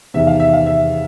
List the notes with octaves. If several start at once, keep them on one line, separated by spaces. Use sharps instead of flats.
E2 C3 D#3 E5
F5
E5
F5
E5